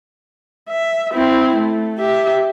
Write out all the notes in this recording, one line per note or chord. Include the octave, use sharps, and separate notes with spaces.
E5
C4 E4
A3
G4 E5